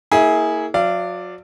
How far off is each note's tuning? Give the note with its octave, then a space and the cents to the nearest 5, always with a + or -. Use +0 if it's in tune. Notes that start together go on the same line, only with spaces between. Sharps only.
A#3 -20 E4 -30 G#4 +0
F#3 -40 D5 +0 F5 -35